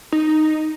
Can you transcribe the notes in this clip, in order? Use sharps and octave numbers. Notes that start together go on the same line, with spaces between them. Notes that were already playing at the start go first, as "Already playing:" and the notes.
D#4